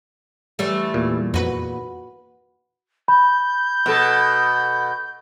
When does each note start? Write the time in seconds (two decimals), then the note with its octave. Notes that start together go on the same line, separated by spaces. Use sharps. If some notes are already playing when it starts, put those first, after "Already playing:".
0.59 E3 G3 A3
0.94 E2 A#2
1.34 F2 F#4 B4
3.08 B5 G6
3.86 B2 A4